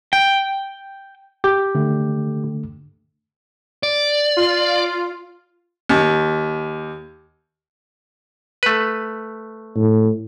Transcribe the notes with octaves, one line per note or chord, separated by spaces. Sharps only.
G5
G4
D3 A3
D5
F4
D#2
A3 B4
A2